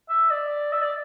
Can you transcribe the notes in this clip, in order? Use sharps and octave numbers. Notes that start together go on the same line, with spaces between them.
E5
D5
E5
D5